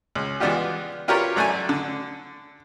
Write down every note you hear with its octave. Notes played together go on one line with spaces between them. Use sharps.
C#2
E3 G#3 B3 D4 F4 G4
D4 F4 G4 A#4 B4 C#5
A1 F#3 A3 D4 G#5
D3